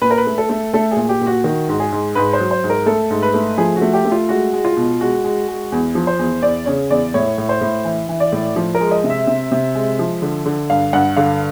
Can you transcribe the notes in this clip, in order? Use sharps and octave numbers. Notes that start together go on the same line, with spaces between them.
A#2 B4
A#4
B4
A3
A4
A3
A3 A4
G#4
A#2
G4
A#2
F#4
D#3 F#4
G#2
G#4
G#2
G#2 B4
C5
F#3
C5
G#2
A#4
A3 A4
G#2
B4
A3
F3 G#4
F#4
A3
G4
A3
F4
G#3 F#4
G#3
F4
B2
G#3 F#4
G#3
G#3
E2
F3
C5
E2
E2 D5
C#3 C#5
E2 D5
A2 C#5
A2
C5
A2
E3
E3
D5
A2
F3
A#4
G#3
D#5
C3
E5
C3
C3
G#3
F3
D3
D3
G2 F5
G2 F#5
D3 F5